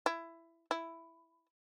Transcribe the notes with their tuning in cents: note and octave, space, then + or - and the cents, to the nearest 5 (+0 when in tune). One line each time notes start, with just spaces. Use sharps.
E4 +15
E4 +5